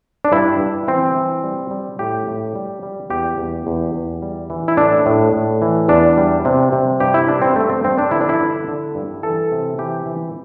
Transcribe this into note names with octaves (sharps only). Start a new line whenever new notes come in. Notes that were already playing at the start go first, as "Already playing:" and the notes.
D4
G2 E4
G2
E3 C4
E3
G3
G3
A2 G4
A2
G3
G3
E2 G4
E2
E2
E2
G3
E3
E4
A2 D4
A2
A2
E3
E2 D4
G3
C3
C3
G2 G4
E4
G3 D4
C4
G2 A3
C4
G2 C4
D4
D3 E4
D4
E4
D3
D3
G2
E3 A4
C3
E3 G4
E3